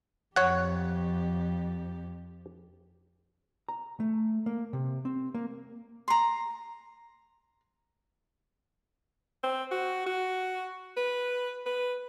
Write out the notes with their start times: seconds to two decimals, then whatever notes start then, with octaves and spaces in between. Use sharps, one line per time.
0.36 F2 G4 C#5 F#5
3.69 A#5
4.00 A3
4.46 A#3
4.73 C3
5.05 C4
5.34 A#3
6.08 A#5 C6
9.43 C4
9.71 F#4
10.06 F#4
10.97 B4
11.66 B4